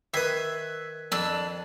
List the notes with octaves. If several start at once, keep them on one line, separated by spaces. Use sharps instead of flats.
D#3 B4 E5 D#6 F#6 G#6 C7
F2 D4 E6